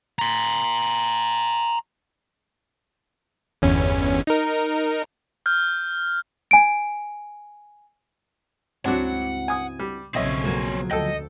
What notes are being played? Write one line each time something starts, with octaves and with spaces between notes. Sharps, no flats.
A#5 C6
G1 E2 C#4
D#4 A#4
F6 G6
G#5 D7
C#2 G2 F#3 C4 D4 E4 F#4 F#5
G#5 D#6
G3
B1 F2 C#3 C4 C#5 D#5 E5
F3 F#3 A#3
D2 A4 D#5 G5